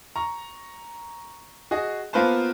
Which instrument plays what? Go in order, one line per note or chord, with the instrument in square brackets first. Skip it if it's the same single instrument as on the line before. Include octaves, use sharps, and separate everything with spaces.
[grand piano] A#5 C#6
F#4 G#4 D#5
A#3 B3 F4 B4 C5 A5